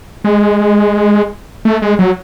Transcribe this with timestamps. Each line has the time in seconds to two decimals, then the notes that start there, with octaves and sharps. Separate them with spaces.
0.24 G#3
1.65 A3
1.82 G#3
1.99 F#3